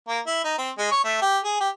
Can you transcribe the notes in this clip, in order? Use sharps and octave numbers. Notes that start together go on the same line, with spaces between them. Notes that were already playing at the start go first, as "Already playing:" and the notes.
A#3
E4
D#4
C4
G#3
C#5
A3
G4
G#4
G4